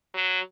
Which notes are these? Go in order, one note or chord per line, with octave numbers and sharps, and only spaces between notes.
F#3